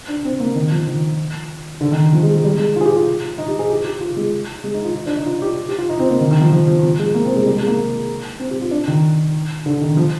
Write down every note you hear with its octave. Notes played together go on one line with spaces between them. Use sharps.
D4
C4
A#3
D#3
F3
D#3
D3
D#3
F3
G#3
G#3
G3
G#3
F4
G#4
G4
F4
D#4
G4
G#4
G4
G4
F4
G#3
G#3
D#4
F4
F4
D4
D#4
F4
G4
G4
F4
D#4
C4
A#3
D#3
D#3
F3
F3
F3
F3
G#3
A#3
C4
G#3
G3
G#3
A#3
C4
G4
F4
D4
D#3
D3
D#3
F3